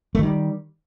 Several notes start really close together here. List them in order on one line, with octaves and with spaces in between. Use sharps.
A3 D#3 G3